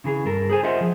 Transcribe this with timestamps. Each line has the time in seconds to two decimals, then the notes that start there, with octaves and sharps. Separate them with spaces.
0.04 C#3 E3 G#4
0.25 G2 A4 A#4
0.50 G#4 C5 G#5
0.63 F4 C5 D#5 E5 F#5
0.81 F3